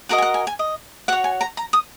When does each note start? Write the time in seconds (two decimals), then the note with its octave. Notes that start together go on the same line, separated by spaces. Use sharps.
0.09 F#4 A#4 D#5 F#5
0.18 G#5
0.22 F#5
0.34 G#5
0.47 G#5
0.59 D#5
1.08 F#4 C#5 F#5
1.24 G#5
1.41 A#5
1.57 A#5
1.73 D#6